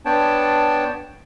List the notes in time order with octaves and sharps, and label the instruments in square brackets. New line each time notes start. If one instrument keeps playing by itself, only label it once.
[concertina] B3 D4 C#5 G5 A5